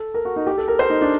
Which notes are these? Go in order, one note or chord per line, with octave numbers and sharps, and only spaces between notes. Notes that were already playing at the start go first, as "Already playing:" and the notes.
Already playing: A4
A#4
F#4
D#4
G4
A4
A#4
C5
D#4
D4